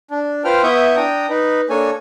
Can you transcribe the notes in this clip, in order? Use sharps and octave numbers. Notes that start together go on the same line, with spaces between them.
D4
F4 B4 C5 G5 F6
B3 E4 E5 C#6 D#6 G6
D4 G5 A#5 D#6
D#4 B4
A#3 D4 A4 C#5 G#5